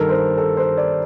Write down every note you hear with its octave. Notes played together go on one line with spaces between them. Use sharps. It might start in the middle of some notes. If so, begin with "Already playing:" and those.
Already playing: G2 D#3 A4 A#4
C5
A4
C5
D5